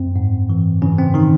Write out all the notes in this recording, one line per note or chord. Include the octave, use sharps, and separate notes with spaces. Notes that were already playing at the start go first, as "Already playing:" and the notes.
Already playing: F#2 C4
G#2
E3
C#3 E3 C#4
C4
D#3 D#4